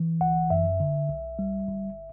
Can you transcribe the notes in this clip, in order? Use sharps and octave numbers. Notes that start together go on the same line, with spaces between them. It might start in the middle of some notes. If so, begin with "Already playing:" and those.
Already playing: E3
G1 F#5
F#2 E5
D3
B1
G3
G1